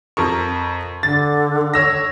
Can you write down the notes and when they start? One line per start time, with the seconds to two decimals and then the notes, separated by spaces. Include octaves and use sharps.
0.17 F2 A#4 C#6
1.03 D3 A6
1.74 C#5 E6 A#6